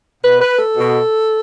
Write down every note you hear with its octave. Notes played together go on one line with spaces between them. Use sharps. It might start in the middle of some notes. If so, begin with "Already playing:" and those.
B2 B4
B4
A4
B2